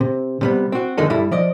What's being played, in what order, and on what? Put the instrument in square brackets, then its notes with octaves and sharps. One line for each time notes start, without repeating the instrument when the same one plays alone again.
[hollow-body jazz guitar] C3
C3 G3 B3
C4 F#4
F2 D3 D#3 G#3 A4
G2 G3 A3 E4
F3 D5 D#5